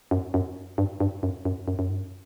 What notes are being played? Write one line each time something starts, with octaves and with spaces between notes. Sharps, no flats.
F#2
F#2
G2
G2
F#2
F#2
F#2
F#2
G2